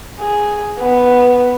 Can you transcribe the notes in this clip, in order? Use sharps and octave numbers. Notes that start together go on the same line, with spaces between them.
G#4
B3